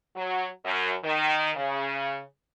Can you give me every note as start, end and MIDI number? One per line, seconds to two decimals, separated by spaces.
0.16 0.46 54
0.64 0.93 42
1.03 1.50 51
1.56 2.19 49